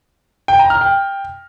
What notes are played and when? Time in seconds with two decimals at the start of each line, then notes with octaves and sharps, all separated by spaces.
0.48 G5
0.59 A#5
0.70 F6
0.81 G5